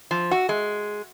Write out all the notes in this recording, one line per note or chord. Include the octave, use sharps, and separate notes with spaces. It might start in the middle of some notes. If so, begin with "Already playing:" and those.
F3
F#4
G#3